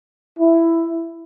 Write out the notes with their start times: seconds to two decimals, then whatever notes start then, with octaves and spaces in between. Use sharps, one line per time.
0.39 E4